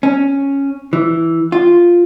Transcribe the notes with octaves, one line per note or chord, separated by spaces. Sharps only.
C#4
E3
F4